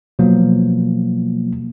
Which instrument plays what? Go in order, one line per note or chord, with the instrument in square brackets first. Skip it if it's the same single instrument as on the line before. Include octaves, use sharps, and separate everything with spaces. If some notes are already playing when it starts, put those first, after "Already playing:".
[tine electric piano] B2 F3 F#3 A#3